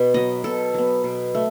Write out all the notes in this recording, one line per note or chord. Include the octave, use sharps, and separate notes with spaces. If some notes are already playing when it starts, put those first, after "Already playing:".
Already playing: B2
F#3 B3 D#5
B2 A4
F#3 B3
B2
A3